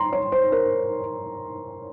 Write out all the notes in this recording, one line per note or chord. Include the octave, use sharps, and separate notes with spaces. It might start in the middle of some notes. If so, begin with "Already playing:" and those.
Already playing: A#5 C6
C#5
C5
A#4